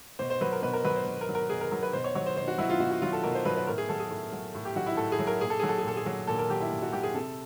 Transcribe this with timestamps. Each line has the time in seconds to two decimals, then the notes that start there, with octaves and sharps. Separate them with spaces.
0.19 B2 C5
0.30 C5
0.41 F#3 B4
0.52 A#4
0.63 B2 B4
0.73 A#4
0.85 F#3 B4
0.96 C5
1.06 B2
1.21 A#4
1.29 F#3
1.35 A#4
1.50 B2 G#4
1.61 A#4
1.71 F#3 A#4
1.83 B4
1.93 B2 C5
2.04 C#5
2.15 F#3 C#5
2.26 C5
2.37 B2 C5
2.48 F#4
2.58 F#3 E4
2.70 F4
2.80 B2 F#4
2.91 F#4
3.02 F#3 F4
3.13 A4
3.24 B2 A#4
3.35 C5
3.45 F#3 B4
3.56 B4
3.67 A2 A#4
3.78 G#4
3.89 F#3 A4
4.00 G#4
4.10 A2
4.32 F#3
4.55 A2
4.65 G4
4.76 F#3 F#4
4.86 E4
4.97 A2 A4
5.12 G#4
5.19 F#3
5.27 A#4
5.41 A#2 G#4
5.50 A4
5.60 F#3 G#4
5.69 A4
5.78 G#4
5.84 A#2 A4
5.97 G#4
6.06 F#3
6.27 A#2 A4
6.39 A#4
6.50 F#3 G4
6.61 E4
6.72 A#2
6.82 F#4
6.93 F#3 G4
7.04 G#4
7.15 C3 A4